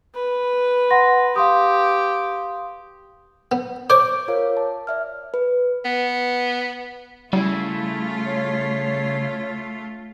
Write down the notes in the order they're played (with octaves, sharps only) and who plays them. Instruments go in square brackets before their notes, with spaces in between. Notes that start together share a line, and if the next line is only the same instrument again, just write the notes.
[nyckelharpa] B4
[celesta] F#5 C6 A#6
[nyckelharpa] G4 [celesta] F5 C6 D#6
[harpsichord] B3
[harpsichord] C5 C#5 [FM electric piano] D6
[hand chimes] F4 A#4 C#5 F5
A5
D5 E5 F6
B4
[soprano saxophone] B3
[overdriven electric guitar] C#3 [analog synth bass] G3 [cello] A3 F4 [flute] E4
[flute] C#5